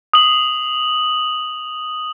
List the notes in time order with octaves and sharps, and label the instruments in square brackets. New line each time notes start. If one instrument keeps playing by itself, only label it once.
[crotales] D#6 F#7